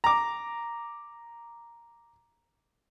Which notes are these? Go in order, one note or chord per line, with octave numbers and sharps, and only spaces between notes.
A#5 D6